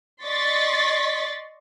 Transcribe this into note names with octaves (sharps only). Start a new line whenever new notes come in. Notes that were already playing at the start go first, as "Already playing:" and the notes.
D5 D#5 C6 C#6 A6 B6